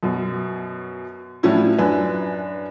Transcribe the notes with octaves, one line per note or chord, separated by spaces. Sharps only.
F#2 B2
A2 F3 F#3 C#4 D4 E4
F#2 D4 B4 G#5